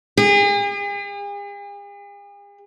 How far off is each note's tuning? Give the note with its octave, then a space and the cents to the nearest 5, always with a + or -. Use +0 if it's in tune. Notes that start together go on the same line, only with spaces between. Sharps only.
G#4 -45